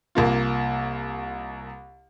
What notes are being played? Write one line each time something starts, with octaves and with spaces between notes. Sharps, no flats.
C2 A#3 F4